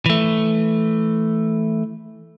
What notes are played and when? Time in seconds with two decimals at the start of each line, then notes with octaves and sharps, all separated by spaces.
0.06 E3 A3